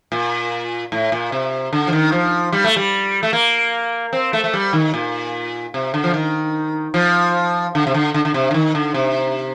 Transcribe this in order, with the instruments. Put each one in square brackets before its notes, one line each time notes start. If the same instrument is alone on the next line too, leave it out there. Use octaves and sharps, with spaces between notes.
[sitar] A#2
A2
A#2
C3
D3
F3
D#3
F3
G3
A3
G3
A3
A#3
C4
A3
A3
G3
D#3
A#2
C3
D3
F3
D#3
F3
D3
C3
D3
D3
D3
C3
D3
D#3
D3
C3